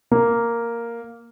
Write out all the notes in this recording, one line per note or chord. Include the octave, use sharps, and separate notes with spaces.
A#3